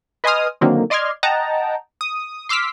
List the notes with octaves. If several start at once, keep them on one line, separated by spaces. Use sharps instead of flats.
B4 D#5 G#5 C6 D#6 F6
D3 D#3 F#3 A#3 C4
D5 D#5 C6 D6 F6 G#6
D#5 F#5 G5 A5 A#5
D#6
C6 D6 E6 F6 B6